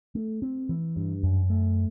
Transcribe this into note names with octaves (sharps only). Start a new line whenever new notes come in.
A3
C4
E3
G2
F#2
A3